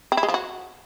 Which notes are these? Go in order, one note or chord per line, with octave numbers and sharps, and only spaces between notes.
C4
E4
G#3
F3
F#4